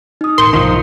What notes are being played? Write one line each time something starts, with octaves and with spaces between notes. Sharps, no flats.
D#4 D#6
A2 D#3 A#4 C6 G6 C#7
B1 G2 D#3 F3 D#4